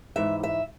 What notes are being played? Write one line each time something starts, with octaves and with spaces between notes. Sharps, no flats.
G#2 E3 E5
E5